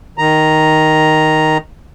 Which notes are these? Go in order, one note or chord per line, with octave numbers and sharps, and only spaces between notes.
D#3 A#5